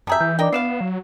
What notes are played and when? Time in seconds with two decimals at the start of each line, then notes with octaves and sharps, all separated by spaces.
0.07 F#2 G3 G#4 E5 A5 A#5 G6
0.20 E3 G6
0.39 D4 D#4 A#4 D5 G5 D6
0.53 B3 E4 D5 F5 C7 E7
0.81 F#3